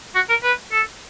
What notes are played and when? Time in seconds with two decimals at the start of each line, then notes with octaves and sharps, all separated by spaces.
0.15 F#4
0.29 A#4
0.43 B4
0.72 A4